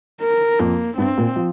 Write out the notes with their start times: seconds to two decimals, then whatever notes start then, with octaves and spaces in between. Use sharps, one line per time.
0.21 A#4
0.59 F2 A#3
0.98 G2 C4
1.18 A#2
1.36 F3